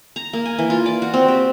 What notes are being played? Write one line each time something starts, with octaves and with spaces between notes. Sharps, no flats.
A#5
A#3
G#5
E3
F4
D5
F#4
C4
G4